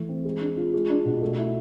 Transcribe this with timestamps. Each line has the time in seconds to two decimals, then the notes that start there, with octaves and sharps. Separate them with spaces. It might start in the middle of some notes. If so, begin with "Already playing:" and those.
Already playing: E3 A3
0.09 C4
0.25 G#3
0.41 D4
0.57 F4
0.74 G#3
0.90 D4
1.05 B2
1.22 A3
1.38 E4